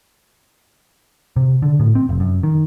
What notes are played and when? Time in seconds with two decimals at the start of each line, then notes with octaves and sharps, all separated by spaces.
1.36 C3
1.62 D3
1.79 A2
1.95 C4
2.09 F1
2.20 F#2
2.43 D#3